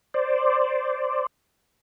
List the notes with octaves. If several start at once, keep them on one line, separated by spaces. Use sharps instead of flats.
C5 D5